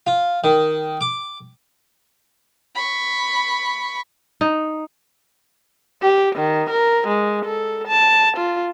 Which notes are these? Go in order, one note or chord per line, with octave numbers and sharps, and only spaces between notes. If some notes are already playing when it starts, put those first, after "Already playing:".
F4
D#3
D6
B5 C#6
D#4
G4
D#3
A#4
G#3
A4
A5
F4